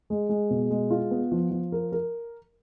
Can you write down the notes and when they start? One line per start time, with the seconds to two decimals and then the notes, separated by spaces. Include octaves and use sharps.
0.10 G#3
0.29 G#3
0.50 B2
0.70 G#3
0.90 F4
1.11 B3
1.32 F3
1.51 F3
1.72 A#4
1.92 A#4